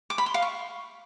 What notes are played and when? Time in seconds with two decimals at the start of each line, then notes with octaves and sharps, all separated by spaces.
0.10 D6
0.18 B5
0.26 C6
0.34 F5
0.42 C#6